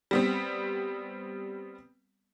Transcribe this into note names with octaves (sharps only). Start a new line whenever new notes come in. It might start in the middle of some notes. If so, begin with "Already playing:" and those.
G3 B3 C4